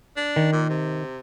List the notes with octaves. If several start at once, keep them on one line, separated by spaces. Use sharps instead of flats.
D4
D#3
A#2
C3